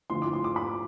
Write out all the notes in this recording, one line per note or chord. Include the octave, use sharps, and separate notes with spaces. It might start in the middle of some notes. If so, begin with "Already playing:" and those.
D3 F3 A3 E4 C6
D6
C6
D6
B5